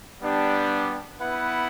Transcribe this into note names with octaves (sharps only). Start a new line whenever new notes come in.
G3 B3 D4 G4
B3 E4 B4 F#5